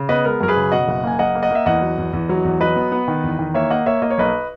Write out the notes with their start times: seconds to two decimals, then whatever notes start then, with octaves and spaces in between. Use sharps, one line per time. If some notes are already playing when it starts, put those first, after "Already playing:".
Already playing: C#3
0.09 B3 B4 D#5
0.25 G#3 A#4
0.41 F#2 A#4
0.48 G#4 B4
0.56 C#3
0.72 B2 D#5 F#5
0.87 F#1
1.04 A#3 G#5
1.19 F#1 D#5 F#5
1.35 A#3
1.42 D#5 F#5
1.51 A#3 E5
1.66 E2 D#5 F#5
1.82 F#3
1.98 E2
2.13 E2
2.29 F#3
2.45 E2
2.60 F#3 B4 D#5
2.76 B3
2.92 B3
3.08 D#3
3.24 E2
3.39 D#3
3.54 A#3 C#5 E5
3.70 A#3 D#5 F#5
3.86 A#3 C#5 E5
4.02 A#3 D#5
4.10 C#5
4.18 B1 B4 D#5